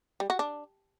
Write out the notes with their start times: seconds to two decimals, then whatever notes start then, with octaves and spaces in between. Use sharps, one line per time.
0.20 G3
0.30 F#4
0.39 D4